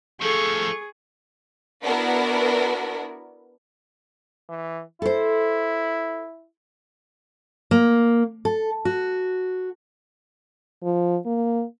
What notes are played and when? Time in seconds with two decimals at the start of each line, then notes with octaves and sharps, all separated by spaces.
0.22 A2 F3 G#4 A4 C#6
1.84 B3 D4 E4 F#4 A#4
4.49 E3
5.02 E4 A4 C5
7.71 A#3
8.45 A4
8.85 F#4
10.83 F3
11.26 A#3